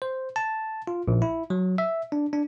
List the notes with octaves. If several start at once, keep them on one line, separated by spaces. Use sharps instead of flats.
C5
A5
F4
A#1
E4
F#3
E5
D4
D4